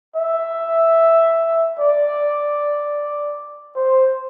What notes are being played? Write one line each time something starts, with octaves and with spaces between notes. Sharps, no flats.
E5
D5
C5